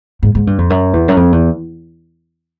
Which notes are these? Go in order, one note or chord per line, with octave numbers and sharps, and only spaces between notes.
G#2
G#2
G2
F2
F#2
E2
F#2
F2
E2